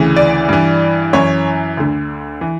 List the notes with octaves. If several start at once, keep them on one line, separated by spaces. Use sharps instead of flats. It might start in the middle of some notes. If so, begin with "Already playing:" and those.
Already playing: D2 C#3 E3
D5
G2 E3
F#2 E3 C#5
D2 D3
E3